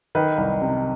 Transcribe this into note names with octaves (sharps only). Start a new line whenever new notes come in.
D#3 B4
C2
C3